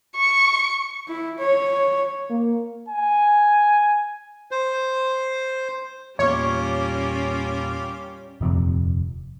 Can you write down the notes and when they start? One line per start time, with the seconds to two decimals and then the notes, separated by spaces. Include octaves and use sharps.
0.16 C#6
1.08 E4
1.39 C#5
2.30 A#3
2.89 G#5
4.51 C5
6.19 E2 A#2 G3 A#3 C#4 F4 G4 C#5
8.41 D#1 F2 C3